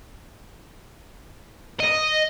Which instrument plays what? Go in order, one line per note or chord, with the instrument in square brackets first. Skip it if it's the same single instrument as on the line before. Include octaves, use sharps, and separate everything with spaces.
[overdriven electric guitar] D#5